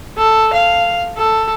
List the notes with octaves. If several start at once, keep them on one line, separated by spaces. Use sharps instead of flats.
A4
F5
A4